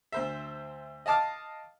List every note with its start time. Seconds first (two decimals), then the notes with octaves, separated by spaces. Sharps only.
0.12 D2 C5 E5
1.06 D#5 F5 A5 D6 F6